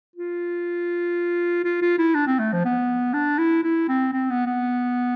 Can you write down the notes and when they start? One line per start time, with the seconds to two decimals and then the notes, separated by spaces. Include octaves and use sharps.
0.16 F4
1.64 F4
1.82 F4
1.98 E4
2.15 D4
2.27 C4
2.39 A3
2.52 F3
2.65 B3
3.14 D4
3.38 E4
3.63 E4
3.88 C4
4.13 C4
4.30 B3
4.46 B3